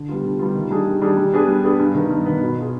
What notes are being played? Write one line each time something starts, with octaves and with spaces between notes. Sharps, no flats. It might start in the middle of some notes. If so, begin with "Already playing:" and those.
Already playing: D3
G3 B3 F4
D3
G3 B3 F4
D#3
G3 D4 G#4
D#3
G3 D4 G#4
G3
B3 D4 G#4 B4
G3
B3 D4 G#4 B4
G2
D#3 B3
G2
D#3 B3
B2
B3 F4 G#4